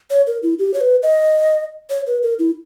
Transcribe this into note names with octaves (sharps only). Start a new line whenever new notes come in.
C#5
A#4
E4
G4
C#5
B4
D#5
C#5
B4
A#4
E4